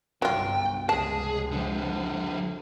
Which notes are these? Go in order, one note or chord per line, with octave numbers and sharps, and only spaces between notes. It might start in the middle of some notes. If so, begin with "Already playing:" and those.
G1 C2 F#3 F4 G5
F1 C#2 G#3 G#4 A5
D3 F3